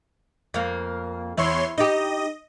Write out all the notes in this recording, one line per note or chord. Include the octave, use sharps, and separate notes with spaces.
F2 A#3
E2 E4 C#5 C6
D#4 G4 D#5